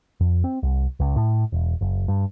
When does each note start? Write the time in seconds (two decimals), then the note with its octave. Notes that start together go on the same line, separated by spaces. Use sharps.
0.20 F2
0.44 C4
0.63 C2
1.00 C#2
1.16 A2
1.52 E1
1.81 F#1
2.08 G2